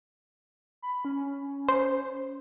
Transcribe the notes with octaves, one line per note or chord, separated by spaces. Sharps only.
B5
C#4
C5